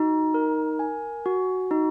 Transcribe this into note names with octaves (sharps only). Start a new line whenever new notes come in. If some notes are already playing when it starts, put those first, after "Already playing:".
Already playing: D#4 F#4
A#4
G#5
F#4
D#4